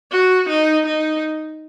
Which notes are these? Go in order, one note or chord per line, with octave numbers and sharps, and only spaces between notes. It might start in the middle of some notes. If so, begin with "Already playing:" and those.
F#4
D#4
D#4